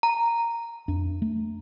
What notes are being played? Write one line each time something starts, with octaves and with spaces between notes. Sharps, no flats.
A#5
F2 D4
A3